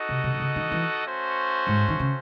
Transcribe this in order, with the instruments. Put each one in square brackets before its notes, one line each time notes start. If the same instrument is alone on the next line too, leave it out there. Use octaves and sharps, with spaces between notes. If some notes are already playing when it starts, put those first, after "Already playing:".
Already playing: [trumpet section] D#4 F#4 A4 D#5 F#5
[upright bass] C3
C3
C3
C#3
D#3
E3
[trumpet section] A3 C#4 F#4 C5
[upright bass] G#2
D#3
C#3